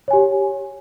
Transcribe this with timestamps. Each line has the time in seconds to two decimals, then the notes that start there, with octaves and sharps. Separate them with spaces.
0.08 C#5
0.11 G#5
0.13 G4